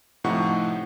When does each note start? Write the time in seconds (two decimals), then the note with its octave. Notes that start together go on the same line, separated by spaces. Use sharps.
0.24 A2 C3 F3 D#4 F#5 C#6